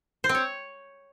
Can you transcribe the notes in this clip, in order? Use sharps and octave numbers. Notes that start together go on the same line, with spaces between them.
C5
C4
C#5